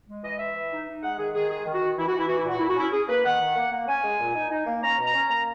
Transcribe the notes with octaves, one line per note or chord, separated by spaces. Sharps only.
G#3
E3 D#5
E3 E5
E3
D#4
D#4
G#3 F#5
D#3 G#4
D#3 G#4
G#3 G#4
D#3
F#4
D#3
E3 E4
F#4
E3 E4
E3 F#4
E4
A#2 F#4
A#2 E4
F#4
C#4 E4
C#4 G#4
A#3 B4
D#3 F#5
D#3
A#3
A#3
C#4 G#5
G#3
A#2
D#4
D#4
A#3
C#4 A#5
B2
A#5
C#4
A#3 A#5